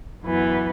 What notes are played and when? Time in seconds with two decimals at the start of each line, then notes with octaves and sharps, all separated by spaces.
0.24 F#2 E3 B3